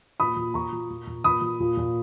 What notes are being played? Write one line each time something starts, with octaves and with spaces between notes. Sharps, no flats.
A#2 B5 D#6
A#2
A#2 A#5 C#6
A#2
A#2
A#2
A#2 B5 D#6
A#2
A#2
A#2